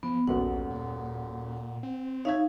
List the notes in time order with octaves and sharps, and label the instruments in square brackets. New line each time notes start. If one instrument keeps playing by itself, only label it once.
[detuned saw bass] F3 [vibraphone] B3
[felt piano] D#1 F#2 B3 [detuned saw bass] A#1 [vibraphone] F#5
[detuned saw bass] A#2
C4
[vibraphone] D#4 F5 [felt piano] C#5 E5 G#6